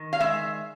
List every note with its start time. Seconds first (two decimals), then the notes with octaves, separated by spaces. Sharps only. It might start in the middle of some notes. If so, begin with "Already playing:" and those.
Already playing: D#3
0.13 F5
0.20 G#3 E5